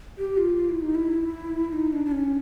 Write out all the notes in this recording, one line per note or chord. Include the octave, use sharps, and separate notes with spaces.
G4
F4
F4
E4
D#4
E4
D#4
D4
D4
C#4